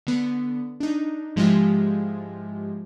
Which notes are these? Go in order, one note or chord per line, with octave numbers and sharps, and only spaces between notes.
D3 B3
D4 D#4
G#2 F3 G#3 E4 F4 G4